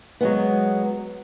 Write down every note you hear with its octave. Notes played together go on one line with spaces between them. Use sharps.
F#3 G#3 B3